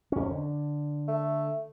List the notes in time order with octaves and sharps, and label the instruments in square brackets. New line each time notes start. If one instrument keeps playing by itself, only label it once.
[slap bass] F2 C#4
D3
[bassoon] A3